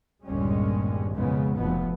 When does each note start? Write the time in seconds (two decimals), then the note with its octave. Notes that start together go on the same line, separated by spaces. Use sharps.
0.25 G1 D#2 A#2 G3 G#3 C#4
1.13 B1 F2 G#2 C#3 G#3 B3
1.57 F1 B2 F3 B3